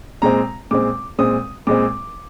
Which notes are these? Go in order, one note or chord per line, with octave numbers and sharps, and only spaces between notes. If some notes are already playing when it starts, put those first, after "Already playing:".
A#2 G#3 C4 A#5
A#2 G#3 C4 D6
A#2 G#3 C4 D#6
A#2 G#3 C4 D6